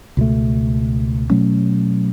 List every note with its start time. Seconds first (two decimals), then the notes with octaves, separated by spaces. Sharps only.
0.17 C#2 B2 A3
1.30 B2 F#3 A3 C#4